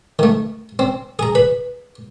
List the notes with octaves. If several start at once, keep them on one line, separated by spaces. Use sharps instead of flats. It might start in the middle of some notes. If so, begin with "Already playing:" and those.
D#3 A3
C4
G#4 A#5
B4 B5